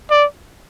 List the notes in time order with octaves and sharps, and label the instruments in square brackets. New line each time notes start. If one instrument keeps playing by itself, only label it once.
[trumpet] D5